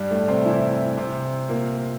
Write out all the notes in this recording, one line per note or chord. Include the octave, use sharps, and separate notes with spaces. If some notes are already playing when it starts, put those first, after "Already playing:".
Already playing: G2 G3
A2 A3
C3 C4
E3 E4
C3 C4
A#2 A#3